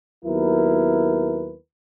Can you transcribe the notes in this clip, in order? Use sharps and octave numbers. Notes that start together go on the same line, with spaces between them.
D#2 F#3 B3 E4 A#4 B4